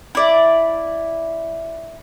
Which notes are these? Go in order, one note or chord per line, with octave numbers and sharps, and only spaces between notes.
E4 D5